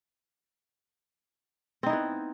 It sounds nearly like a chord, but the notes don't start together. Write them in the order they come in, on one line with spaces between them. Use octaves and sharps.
C4 D#4 E4 B3